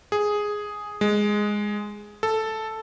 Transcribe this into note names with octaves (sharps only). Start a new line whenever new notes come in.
G#4
G#3
A4